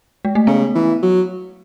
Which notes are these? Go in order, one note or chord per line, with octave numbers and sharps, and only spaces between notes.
G#3
A3
C#3 B3
E3
F#3